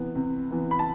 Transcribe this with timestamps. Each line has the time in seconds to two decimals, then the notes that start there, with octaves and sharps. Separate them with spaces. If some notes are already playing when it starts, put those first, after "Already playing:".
Already playing: C3 E3 B3
0.15 C3
0.51 E3 B3
0.71 B5
0.79 A5